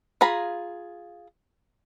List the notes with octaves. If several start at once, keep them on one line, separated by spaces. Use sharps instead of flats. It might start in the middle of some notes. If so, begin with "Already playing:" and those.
F4 G#4 A#5 B5